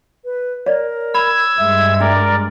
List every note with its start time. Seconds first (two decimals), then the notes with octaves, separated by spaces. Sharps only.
0.25 B4
0.66 A#4 C#5 D5
1.14 B5 E6 G#6
1.58 G2 G#3 E5
2.00 D4 A#4 D5